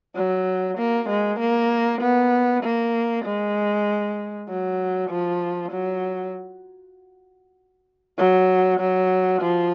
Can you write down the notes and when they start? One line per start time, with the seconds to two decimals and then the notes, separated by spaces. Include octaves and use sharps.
0.15 F#3
0.78 A#3
1.09 G#3
1.40 A#3
2.01 B3
2.63 A#3
3.25 G#3
4.48 F#3
5.10 F3
5.72 F#3
8.18 F#3
8.80 F#3
9.41 F3